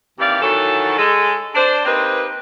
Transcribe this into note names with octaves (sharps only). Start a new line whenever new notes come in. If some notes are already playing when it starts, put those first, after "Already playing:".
D#2 C3 E3 G4 D5 F5
D#3 E3 F#3 F#4 A4
G#3 A4
D4 C5
A#3 C4 D#4 G4 B4